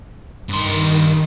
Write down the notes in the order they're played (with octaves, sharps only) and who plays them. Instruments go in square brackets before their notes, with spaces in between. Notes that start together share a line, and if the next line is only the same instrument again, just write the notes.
[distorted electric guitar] G2 C6 [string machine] D#3